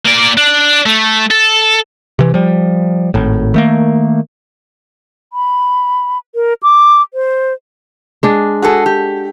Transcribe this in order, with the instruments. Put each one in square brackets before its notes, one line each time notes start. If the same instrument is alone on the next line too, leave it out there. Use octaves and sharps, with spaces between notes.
[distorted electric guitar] A#3 D5
D4
A3
A4
[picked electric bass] C3 E3
F3 G3
G#1 A2
D#3 A3 A#3
[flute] B5
A#4
D6
C5
[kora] G#3 D4
[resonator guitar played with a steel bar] F#4 G#4 A4
G4